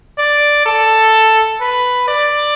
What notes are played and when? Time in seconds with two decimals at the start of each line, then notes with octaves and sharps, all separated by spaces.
0.18 D5
0.66 A4
1.60 B4
2.08 D5